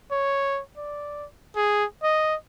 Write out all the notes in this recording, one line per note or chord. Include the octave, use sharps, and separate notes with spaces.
C#5
D5
G#4
D#5